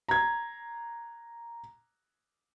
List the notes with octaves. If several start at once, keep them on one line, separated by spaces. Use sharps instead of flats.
A#5 G#6